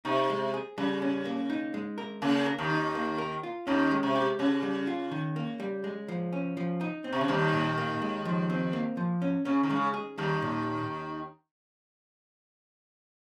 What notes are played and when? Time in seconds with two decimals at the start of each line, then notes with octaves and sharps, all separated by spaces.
0.05 C3 D#4
0.30 G#3
0.54 G#4
0.78 C#3 G3
1.02 C#4
1.25 A#3
1.50 D#4
1.74 G#3
1.98 A#4
2.22 C#3 A#3
2.46 A#4
2.58 D#2 D#3
2.71 D#4
2.95 A#3
3.18 A#4
3.43 F4
3.67 D#2 D#3 C#4
3.91 G#3
4.03 C3
4.16 G4
4.39 C#3 C#4
4.63 G3
4.87 F4
5.11 D#3
5.36 A#3
5.60 G3
5.84 G#3
6.08 F3
6.33 C#4
6.57 F3
6.81 D#4
7.04 C4
7.13 C3
7.21 C#3
7.28 D#2 D#3 G3
7.53 A#2
7.77 A#3
8.02 G#3
8.25 F3
8.50 C4
8.73 A#3
8.97 F3
9.22 C#4
9.45 C#3 C#4
9.63 D#3
9.69 C#3 G#3
9.94 G#4
10.18 D#2 D#3 G3
10.42 A#2